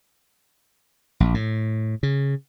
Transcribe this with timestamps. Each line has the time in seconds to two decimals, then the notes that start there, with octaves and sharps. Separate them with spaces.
1.20 A#1
1.34 A2
2.03 C#3